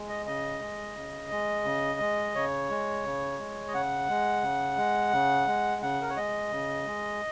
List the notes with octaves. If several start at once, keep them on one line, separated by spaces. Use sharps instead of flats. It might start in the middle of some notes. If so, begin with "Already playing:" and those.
Already playing: G#3
D#5
C#3 D#5
G#3
C#3
G#3
C#3
G#3
C#3 C#5
G#3
C#3
G#3
D#5
C#3 F#5
G#3
C#3
G#3
C#3
G#3
C#3 F#5
A#4
C#5
G#3 D#5
C#3
G#3